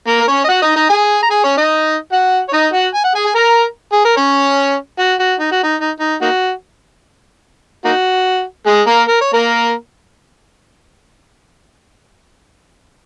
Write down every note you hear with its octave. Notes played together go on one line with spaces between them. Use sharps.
A#3 A#4
A#4
C#4 C#5
D#5
F#4 F#5
D#4 D#5
D#4 D#5
G#4 G#5
A#5
G#4 G#5
C#4 C#5
D#4 D#5
F#4 F#5
C#5
D#4 D#5
F#4 F#5
G#5
F#5
G#4 G#5
G#5
A#4 A#5
G#4
A#4
C#4 C#5
F#4
F#4
D#4
F#4
D#4
D#4
D#4
A#3 D#4 F#4
A#3 D#4 F#4
G#3 G#4
A#3 A#4
A#4
C#5
A#3 A#4